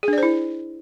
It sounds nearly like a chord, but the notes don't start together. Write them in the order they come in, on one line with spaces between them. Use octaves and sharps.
G#4 D4 D5 C5 E4